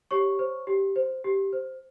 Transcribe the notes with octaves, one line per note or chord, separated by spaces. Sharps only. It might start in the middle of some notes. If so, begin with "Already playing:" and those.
G4 C#5 C#6
C5
G4
C5
G4
C5